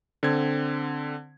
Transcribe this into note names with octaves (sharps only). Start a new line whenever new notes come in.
D3 C4 G#6